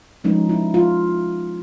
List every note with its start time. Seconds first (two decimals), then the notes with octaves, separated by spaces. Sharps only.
0.24 F3 G#3 C#4 D#4
0.49 E4
0.74 F4